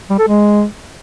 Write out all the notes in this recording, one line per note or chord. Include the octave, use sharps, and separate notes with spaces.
G3
A4
G#3